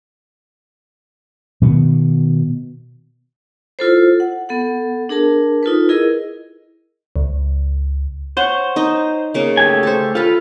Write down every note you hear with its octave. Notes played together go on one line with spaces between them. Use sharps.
B2 D#3 B3
E4 F4 A4 C5
F#5
B3 A4 F#5
D4 G#4 A#4 A5
D#4 F4 A4 B4
E4 G#4 A#4 D#5
C#2
C5 C#5 F#5
D#4 D#5
C#3 A#3 F5
A3 G4 G#5
A4 C5
F4 A4 B4